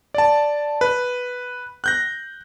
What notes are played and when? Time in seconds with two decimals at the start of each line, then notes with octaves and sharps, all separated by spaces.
0.14 D5 A5
0.81 B4
1.84 F#6 G6 A#6